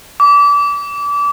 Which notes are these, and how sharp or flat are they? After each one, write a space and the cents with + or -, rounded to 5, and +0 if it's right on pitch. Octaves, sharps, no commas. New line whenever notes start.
D6 -30